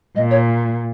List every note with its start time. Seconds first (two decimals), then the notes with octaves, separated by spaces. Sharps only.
0.16 A#2 D#5
0.31 C#5